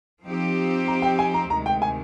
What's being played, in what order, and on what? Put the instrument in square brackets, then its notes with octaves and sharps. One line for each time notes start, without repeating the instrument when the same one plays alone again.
[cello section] F3 C4 D#4 G4
[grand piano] A#5
G5
G#5
A#5
[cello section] D2 C3 D#3 G#3 [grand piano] A#5
[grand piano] G5
G#5